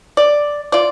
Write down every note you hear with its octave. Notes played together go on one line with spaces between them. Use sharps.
D5
F4 D5